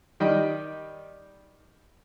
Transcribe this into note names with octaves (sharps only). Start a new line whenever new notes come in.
D#3 G3 D#5 G5